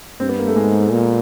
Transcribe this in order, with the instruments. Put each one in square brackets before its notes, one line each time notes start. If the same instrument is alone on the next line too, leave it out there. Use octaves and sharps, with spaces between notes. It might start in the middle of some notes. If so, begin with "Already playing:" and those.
[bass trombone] G2 [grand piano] C4
[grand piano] B3
A#3
A3
[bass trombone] G#2 [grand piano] G#3
[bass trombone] A#2